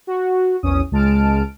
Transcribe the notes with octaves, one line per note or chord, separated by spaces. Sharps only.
F#4
A#1 E2 C#4 D#6
C#2 G#3 A5 F6 D7